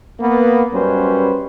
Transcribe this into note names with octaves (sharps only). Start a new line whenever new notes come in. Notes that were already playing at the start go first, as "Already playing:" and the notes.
A#3 B3
F#2 G3 C#4 B4 C5